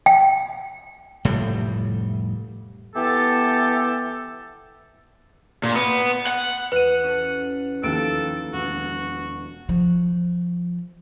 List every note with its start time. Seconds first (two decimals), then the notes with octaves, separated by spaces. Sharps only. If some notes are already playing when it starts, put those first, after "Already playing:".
0.06 G5
1.25 F1 A2 G3
2.95 E3 B3 G4 A4
5.63 A#2
5.75 B3
6.27 F#5
6.72 E2 B4 F#5 D#7
7.04 C#4 F#4 A4
7.83 D#2 D#3 F3 E4 A4 D7
8.53 E1 F#4
9.69 F3